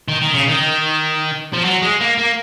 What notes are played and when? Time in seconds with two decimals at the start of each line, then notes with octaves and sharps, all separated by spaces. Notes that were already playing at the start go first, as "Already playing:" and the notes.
0.08 D#3
0.22 D#3
0.34 C#3
0.48 D#3
1.53 F3
1.65 F#3
1.82 G#3
2.00 A#3
2.18 A#3